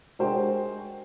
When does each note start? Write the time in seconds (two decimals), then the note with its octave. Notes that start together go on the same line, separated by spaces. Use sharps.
0.19 G#3 D4 F#4 A#4 C5 G5